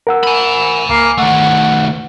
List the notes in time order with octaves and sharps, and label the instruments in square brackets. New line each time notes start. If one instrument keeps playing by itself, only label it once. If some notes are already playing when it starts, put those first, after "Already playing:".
[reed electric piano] A#4 F#5 E6
[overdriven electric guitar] G#5 B5
[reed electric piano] C#2 [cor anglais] A#3
[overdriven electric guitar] D#3 A3 [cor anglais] F#5